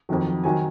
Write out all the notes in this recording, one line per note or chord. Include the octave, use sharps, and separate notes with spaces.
F2 D#3 F#3
D#3 F#3 G#5